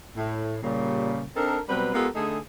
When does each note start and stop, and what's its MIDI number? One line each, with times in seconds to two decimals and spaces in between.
0.17 0.59 45
0.63 1.25 46
0.63 1.25 49
0.63 1.25 55
1.36 1.59 60
1.36 1.59 62
1.36 1.59 63
1.36 1.59 69
1.36 1.59 70
1.68 1.93 47
1.68 1.93 54
1.68 1.93 55
1.68 1.93 60
1.68 1.93 71
1.94 2.08 56
1.94 2.08 59
1.94 2.08 65
1.94 2.08 67
1.94 2.08 69
1.94 2.08 70
2.15 2.39 50
2.15 2.39 57
2.15 2.39 63
2.15 2.39 68